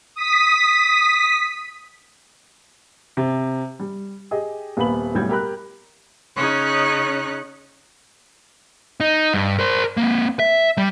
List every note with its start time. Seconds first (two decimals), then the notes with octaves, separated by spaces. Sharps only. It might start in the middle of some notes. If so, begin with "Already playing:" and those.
0.15 D#6 B6
3.17 C3
3.79 G3
4.31 G4 G#4 D#5
4.77 D#1 A#3 B3 F5 B5 F#7
5.15 B1 A2 G3 G6 G#6
5.30 G4 A#4 B5 F#6
6.36 C#3 C#4 D#4 C#5 F#6
9.00 D#4
9.34 G2
9.59 A#4 C5
9.97 A#3 C4
10.39 E5
10.78 G3